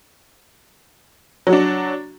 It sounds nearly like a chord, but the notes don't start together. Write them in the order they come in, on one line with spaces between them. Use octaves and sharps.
F#3 F#4 D4